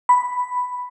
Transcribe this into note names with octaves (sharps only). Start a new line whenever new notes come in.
B5